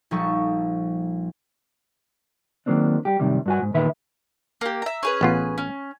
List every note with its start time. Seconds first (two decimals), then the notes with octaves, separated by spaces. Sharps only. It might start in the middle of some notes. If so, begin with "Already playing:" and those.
0.11 A#1 F3 G3 D#4 A4 C#6
2.66 D#3 F#3 A#3 C4 D4
3.05 G3 G4
3.19 F#2 A2 C3 D#3 G3
3.46 G2 F#4 G#5
3.62 G#2
3.74 E2 A#2 D#3 B4 E5
4.61 A#3 G4
4.82 E5 A#5
5.03 C#4 G#4 B4
5.21 A1 B3 F4
5.58 C#4